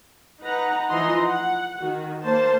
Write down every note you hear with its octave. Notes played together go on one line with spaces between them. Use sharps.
D#4 B4 F#5 A#5
E3 F3 D#4 D#5 A#5 C6
F#5
D#3 F#4
A#3 C5 A5